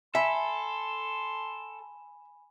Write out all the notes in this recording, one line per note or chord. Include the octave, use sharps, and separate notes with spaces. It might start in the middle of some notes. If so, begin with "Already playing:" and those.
A4 E5 G#5 B5 C6